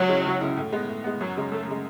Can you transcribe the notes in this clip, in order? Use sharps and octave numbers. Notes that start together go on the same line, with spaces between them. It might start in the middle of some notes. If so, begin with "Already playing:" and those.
Already playing: C#2 F#3
C#3 G#3 C#4 E4
C#2
C#3 G#3 C#4 E4
A2
G#3 B3
A2
G#3 B3
F#2 F#3
C#3 G#3
F#2 A3
C#3 G#3